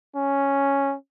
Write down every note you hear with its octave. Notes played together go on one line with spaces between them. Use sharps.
C#4